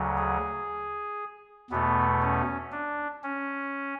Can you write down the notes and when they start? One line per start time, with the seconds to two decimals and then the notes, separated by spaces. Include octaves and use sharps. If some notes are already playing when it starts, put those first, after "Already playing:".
Already playing: D2 C#3 F#3
0.18 G#4
1.70 E2 B2 A3 B3
2.22 C#4
2.72 D4
3.24 C#4